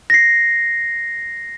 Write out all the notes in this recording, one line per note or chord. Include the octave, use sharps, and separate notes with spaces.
A#6 C7